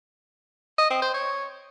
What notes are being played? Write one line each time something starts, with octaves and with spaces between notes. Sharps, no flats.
D#5
C4
C5
C#5